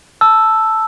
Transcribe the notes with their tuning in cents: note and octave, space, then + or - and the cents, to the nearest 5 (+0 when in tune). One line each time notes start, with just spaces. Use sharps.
A5 +0 E6 +0